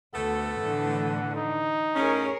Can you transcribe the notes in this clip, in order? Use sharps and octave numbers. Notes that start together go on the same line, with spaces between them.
D2 A3 B3 A4 F#5
A2 D3 E3
D#4
A2 A3 C#4 G#4 A#4 C#5